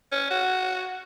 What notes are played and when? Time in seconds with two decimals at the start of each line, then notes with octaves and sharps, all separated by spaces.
0.12 C#4
0.31 F#4